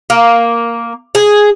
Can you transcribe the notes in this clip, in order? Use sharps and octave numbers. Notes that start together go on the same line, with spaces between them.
A#3
G#4